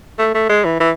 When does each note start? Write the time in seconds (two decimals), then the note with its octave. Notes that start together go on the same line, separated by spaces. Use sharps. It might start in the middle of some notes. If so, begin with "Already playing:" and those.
0.19 A3
0.34 A3
0.49 G#3
0.65 E3
0.80 E3